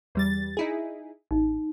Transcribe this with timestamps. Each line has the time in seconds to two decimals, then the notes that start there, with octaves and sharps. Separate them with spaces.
0.15 E2 G3 A6
0.57 D#4 E4 G#4
1.31 A1 D#4